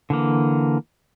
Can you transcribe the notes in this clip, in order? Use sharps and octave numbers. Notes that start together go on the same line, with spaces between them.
D3 E3 A#3